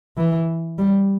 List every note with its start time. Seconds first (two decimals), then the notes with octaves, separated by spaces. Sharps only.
0.17 E3
0.78 G3